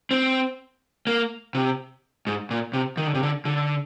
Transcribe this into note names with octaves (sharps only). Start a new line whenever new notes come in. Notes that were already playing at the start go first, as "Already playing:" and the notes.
C4
A#3
C3
G#2
A#2
C3
D#3
D3
C3
D3
D3